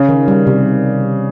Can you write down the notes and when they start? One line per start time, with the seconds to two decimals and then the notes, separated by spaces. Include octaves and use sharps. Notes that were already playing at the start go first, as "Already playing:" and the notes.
Already playing: C#3 C#4
0.09 D#3
0.28 G3
0.47 C3